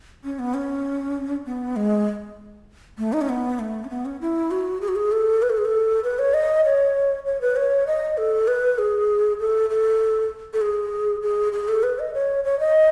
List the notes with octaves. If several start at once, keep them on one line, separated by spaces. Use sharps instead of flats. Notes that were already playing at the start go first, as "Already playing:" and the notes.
C#4
B3
C#4
B3
G#3
A3
D#4
C#4
B3
A3
C#4
B3
C#4
E4
F#4
G#4
F#4
G#4
A4
B4
A4
G#4
A4
B4
C#5
D#5
C#5
C#5
B4
C#5
D#5
A4
B4
G#4
A4
A4
A4
G#4
G#4
G#4
A4
B4
D#5
C#5
C#5
D#5